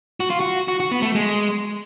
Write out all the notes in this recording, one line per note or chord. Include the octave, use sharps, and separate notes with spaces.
F#4
F4
F#4
F#4
F#4
B3
A3
G#3